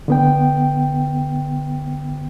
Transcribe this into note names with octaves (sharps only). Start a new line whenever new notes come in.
D3 B3 G5